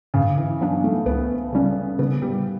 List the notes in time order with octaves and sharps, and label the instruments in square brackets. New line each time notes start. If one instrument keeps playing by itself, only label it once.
[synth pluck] G2 [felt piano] C#3
[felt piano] E3
[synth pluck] F#3 B3 D4
[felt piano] A3
[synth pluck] C#2 [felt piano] B3
[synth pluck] C#3 G3 C#4
[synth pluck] C#3 [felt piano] B3
[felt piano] G3